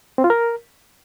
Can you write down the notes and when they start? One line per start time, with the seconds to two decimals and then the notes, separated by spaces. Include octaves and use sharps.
0.18 C4
0.24 F4
0.30 A#4